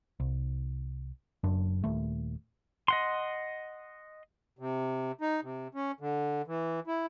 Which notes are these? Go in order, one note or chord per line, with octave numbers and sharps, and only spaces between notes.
C2
F#1 F#2 D4
D#1 D#2 A3
D#5 F#5 C6
C3
D#4
C3
C#4
D3
E3
E4